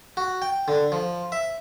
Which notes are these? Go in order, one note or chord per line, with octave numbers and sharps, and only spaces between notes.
F#4
G5
D3
F3
E5